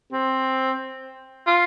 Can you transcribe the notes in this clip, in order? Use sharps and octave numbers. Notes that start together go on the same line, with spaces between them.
C4
F4